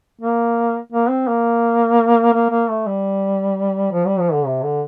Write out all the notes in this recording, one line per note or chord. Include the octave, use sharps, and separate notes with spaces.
A#3
A#3
C4
A#3
A#3
A#3
A3
G3
F3
G3
F3
D3
C3
D3